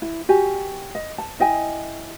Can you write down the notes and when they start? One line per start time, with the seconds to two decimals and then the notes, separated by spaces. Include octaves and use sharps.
0.02 E4
0.29 F#4 G4 G#5
0.95 D#5
1.18 A5
1.40 E4 D#5 G5 G#5